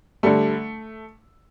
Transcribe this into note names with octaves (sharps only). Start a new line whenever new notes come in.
D3 G3 A3